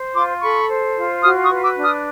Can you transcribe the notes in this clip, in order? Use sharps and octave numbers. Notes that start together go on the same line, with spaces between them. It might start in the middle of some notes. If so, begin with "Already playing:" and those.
Already playing: C5
F4 C6 D6
A4 B5 C#6
C5
F4
F#4 D#6 F6
C#6 D#6
B4
D6 E6
D4
D#6 F6